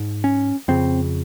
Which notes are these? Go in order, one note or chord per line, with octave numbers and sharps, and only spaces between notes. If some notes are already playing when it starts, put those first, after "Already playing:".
Already playing: G#2
C#4
F2 C#3 C4